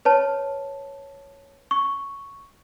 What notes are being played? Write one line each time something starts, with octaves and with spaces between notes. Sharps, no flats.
B4 C#5 A5
C#6